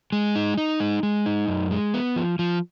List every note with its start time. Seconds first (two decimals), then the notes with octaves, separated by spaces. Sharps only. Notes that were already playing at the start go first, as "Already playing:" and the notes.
0.12 G#3
0.35 D#4
0.58 D#4
0.80 G#3
1.03 G#3
1.26 D#4
1.48 F#2
1.71 G#3
1.94 B3
2.16 F3
2.39 F3